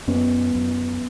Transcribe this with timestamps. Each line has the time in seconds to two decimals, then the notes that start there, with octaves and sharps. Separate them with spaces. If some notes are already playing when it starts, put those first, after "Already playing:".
0.07 F#2 B3 C#4
0.55 F#2